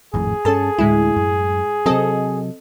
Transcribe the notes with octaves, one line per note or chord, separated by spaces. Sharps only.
G#1 F2 A2 G#4
G2 C#4 A4 A5
D2 A2 G#3 E4
F#2
C3 F#3 C4 A4 D#5